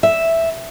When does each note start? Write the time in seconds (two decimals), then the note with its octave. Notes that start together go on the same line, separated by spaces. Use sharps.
0.03 E5